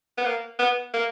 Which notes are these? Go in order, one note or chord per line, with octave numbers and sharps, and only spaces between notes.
B3
A#3
B3
A#3